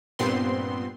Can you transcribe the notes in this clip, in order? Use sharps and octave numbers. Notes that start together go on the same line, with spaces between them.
G2 A#2 B3 C4 C6